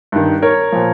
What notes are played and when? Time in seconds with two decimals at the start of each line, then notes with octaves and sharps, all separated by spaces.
0.12 G2 D#3
0.42 A#4 C#5
0.72 A#2 F3